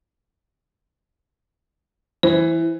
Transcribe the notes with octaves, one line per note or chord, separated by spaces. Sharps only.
E3 C5